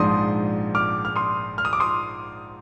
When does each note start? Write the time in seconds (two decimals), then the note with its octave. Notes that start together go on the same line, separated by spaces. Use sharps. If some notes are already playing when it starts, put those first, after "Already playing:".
Already playing: A#1 G#2 F3 G#3 D4 C6 D#6
0.75 D6 F6
1.05 F6
1.16 C6 D#6
1.58 F6
1.65 D#6
1.73 D6
1.80 C6 D#6